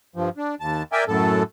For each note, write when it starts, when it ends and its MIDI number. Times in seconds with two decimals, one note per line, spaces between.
0.16 0.29 43
0.16 0.29 53
0.37 0.55 62
0.60 0.83 39
0.60 0.83 81
0.92 1.04 70
0.92 1.04 74
0.92 1.04 76
0.92 1.04 79
0.92 1.04 80
1.08 1.43 42
1.08 1.43 45
1.08 1.43 69